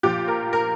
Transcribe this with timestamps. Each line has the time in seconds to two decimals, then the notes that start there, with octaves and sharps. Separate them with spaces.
0.03 A#2 F3 G4
0.28 A#4
0.53 A#4